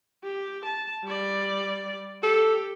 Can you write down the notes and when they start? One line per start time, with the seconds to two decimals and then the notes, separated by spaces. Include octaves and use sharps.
0.24 G4
0.66 A5
1.04 G3 D5
2.23 G4 A4